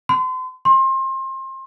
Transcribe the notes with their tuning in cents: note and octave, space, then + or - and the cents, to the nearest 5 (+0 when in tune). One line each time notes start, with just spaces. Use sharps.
C6 -40
C6 +30